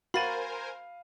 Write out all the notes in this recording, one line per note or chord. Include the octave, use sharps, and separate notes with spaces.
F#4 A#4 C5 F5 G#5 B5 A6 D#7